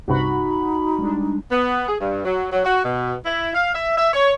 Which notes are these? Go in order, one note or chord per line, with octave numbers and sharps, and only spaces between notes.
C2 G2 C3 D#4 F#4 B5
G3 G#3 D4
B3
G#4
G2
F#3
F#3
F#4
B2
E4
F5
E5
E5
C#5